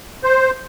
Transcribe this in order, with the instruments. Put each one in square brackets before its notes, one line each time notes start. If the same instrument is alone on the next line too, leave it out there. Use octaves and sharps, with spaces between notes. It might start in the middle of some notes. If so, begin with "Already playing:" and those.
[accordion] C5